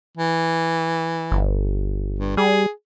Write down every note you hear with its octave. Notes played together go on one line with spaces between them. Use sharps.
E3
G1
G2
G3 G#4